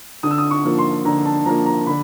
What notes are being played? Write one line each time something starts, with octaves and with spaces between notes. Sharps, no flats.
D3 D#6
E6
D#6
C#6
F3 A#3
C6
D3 A#5
A5
F3 A#3 A#5
A#5
D3 B5